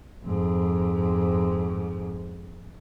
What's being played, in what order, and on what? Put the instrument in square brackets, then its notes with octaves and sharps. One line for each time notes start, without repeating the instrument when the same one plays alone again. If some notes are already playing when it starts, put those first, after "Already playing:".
[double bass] F2 G#2